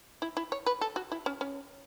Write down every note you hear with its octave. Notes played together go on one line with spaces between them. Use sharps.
E4
E4
C#5
B4
A4
F#4
E4
C#4
C#4